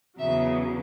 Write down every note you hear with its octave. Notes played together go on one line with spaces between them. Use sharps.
E2 C#3 F#3 E5